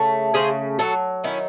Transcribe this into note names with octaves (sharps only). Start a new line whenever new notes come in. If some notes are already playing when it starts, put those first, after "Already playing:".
Already playing: C#3 A3
C#3 G#4 C5
F#3 F#4 A4
D#3 C#4 E4